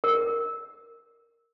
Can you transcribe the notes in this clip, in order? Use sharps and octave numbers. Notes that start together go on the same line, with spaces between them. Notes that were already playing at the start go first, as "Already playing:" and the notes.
A#4